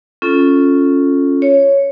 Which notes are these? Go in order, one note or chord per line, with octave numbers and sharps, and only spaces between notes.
C#4 F4 A4
C#5